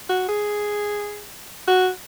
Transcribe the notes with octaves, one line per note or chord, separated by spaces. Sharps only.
F#4
G#4
F#4